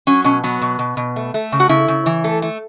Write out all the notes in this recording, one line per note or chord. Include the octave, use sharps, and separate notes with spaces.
F#3 C#4
B2 C#4
F#3 B3
B2
B2
B2
A3
A3
C#3
F#4
C#3 E4
C#3
E3
A3 A4
A3